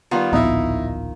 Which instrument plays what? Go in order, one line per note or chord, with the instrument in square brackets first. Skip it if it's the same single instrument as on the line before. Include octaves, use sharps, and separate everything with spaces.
[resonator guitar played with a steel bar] D#3 F4 [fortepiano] G3 B3
[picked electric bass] D1 A#1 B3 [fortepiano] D#4 E4